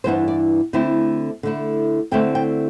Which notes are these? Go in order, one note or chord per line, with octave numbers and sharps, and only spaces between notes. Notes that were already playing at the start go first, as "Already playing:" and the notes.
G2 E3 B3 D4 C5
D5
D3 A3 C4 E4
D3 A3 E4
D3 A3 C4 E4 G5
G5